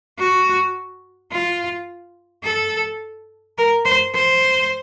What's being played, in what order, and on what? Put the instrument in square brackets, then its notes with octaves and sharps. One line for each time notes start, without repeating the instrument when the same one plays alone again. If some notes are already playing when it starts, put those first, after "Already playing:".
[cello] F#4
F4
A4
A#4
C5
C5